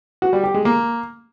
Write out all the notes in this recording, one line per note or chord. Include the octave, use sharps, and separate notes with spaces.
F#4
G3
G4
G#3
A#3